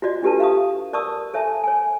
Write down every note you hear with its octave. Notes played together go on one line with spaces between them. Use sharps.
F4 F#4 D5 D#5
D4 F4 G4 A4 B4 A5
E5 F5 A#5 C#6 D#6
A#4 D5 A5 C#6 D#6 E6
A4 C#5 E5 G#5 A5
C#5 G#5